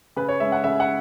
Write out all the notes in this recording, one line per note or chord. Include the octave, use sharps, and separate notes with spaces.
C#3 B4
C#5
G#3 C#4 E5
F#5
C#3 E5
F#5